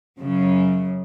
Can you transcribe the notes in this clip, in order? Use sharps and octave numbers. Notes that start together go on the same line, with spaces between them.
F#2 C#3